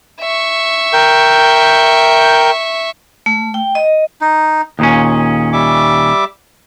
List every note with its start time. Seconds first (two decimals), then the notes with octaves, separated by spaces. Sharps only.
0.21 E5 C#6
0.93 A#4 G5 G6
3.26 A3
3.54 G5
3.75 D#5
4.21 D#4
4.79 D#2 A#2 C#4 G#4
5.53 G3 E5 D6